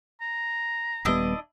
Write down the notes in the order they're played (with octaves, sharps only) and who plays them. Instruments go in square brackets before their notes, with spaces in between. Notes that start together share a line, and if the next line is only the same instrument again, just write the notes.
[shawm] A#5
[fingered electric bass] D#1 G3 B3 [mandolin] D4 E4 D#5